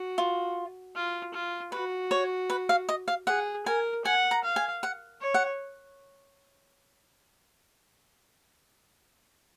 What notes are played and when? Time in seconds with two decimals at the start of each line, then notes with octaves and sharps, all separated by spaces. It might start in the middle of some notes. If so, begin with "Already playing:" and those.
Already playing: F#4
0.18 F4
0.95 F4
1.34 F4
1.72 F#4 B4
2.11 C#5
2.50 B4
2.69 F5
2.89 D#5
3.08 F5
3.27 G#4 F#5
3.66 A#4 G#5
4.05 F#5 G#5
4.31 A#5
4.44 F5
4.56 G#5
4.83 F#5
5.21 C#5
5.34 F#5